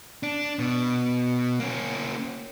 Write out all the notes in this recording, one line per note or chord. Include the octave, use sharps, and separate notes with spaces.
D4
B2
A#3 C#4